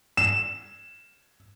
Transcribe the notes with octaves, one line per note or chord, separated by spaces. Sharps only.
E7